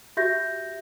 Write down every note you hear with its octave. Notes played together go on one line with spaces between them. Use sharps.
F#4 G4 E5 G6 A#6